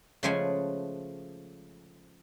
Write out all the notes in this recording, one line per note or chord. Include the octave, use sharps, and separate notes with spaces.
C#3 F3 G#3 A3 F#5 G#5